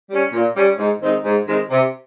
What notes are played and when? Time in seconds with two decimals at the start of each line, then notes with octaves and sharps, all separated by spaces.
0.09 G3 C#4
0.32 A#2
0.56 G3 C#4
0.79 G#2
1.02 D#3 G#3 C4 D#4
1.25 G#2
1.47 D#3 G#3 C4 D#4
1.71 C3